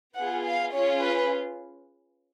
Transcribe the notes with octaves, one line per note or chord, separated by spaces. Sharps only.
B3 F4 G#4 F#5
F5
C#4 F4 G#4 C#5
B4